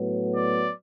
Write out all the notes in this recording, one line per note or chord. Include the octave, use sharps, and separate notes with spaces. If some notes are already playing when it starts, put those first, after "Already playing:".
Already playing: A2 F#3 B3
D5